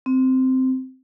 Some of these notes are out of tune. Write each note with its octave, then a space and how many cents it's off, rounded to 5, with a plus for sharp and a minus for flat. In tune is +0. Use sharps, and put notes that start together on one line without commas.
C4 -10